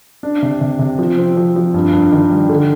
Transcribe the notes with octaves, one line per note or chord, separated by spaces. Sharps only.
D4
C3
C3
C3
F3
C4
F3
F3
G2
G2
D#3
G3
D3